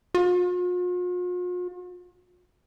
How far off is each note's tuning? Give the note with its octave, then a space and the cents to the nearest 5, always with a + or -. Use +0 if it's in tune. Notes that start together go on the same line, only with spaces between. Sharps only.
F4 +45